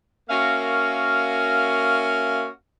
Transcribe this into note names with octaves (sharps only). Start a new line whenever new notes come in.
A#3 C#4 F#4 A#4 E5 F5